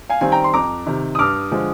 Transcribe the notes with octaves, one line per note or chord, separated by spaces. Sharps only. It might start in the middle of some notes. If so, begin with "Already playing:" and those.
F5 G#5
D#3 G3 C4 G#5
G5 A#5
C6
F2 A#5 D6
C3 D#3
D#6
G2 D6 F6
D3 F3 G#3